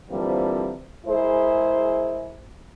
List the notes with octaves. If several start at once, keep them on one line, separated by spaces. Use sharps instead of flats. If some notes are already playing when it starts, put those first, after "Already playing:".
D3 E3 F3 G3 A#3 C4
G#3 E4 G#4 A#4 C5